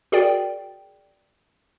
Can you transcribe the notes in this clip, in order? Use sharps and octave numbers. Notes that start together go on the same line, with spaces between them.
F#4 G#4 A#4 D5 G5